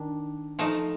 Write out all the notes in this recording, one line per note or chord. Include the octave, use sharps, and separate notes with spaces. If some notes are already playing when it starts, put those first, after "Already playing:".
Already playing: D#3 D4
F3 A3 D#4